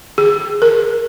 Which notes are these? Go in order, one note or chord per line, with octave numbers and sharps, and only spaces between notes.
G#4
A#4